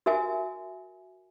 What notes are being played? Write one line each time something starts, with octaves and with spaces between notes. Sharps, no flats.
F#4 A#4 E5 G#5